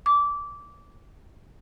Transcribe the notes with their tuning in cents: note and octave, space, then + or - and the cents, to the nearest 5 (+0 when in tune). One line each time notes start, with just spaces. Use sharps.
D6 -20